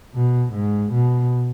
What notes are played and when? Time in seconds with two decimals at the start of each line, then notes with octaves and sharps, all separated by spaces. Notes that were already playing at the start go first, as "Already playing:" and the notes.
0.15 B2
0.53 G#2
0.92 B2